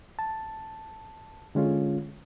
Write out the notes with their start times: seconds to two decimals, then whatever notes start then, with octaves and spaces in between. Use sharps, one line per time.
0.19 A5
1.55 D3 G#3 C#4 F4